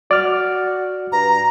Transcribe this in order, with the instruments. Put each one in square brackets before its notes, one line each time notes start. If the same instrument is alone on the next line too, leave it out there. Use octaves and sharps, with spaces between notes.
[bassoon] F#4 [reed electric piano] D5 F6
[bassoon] G2 [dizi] A#5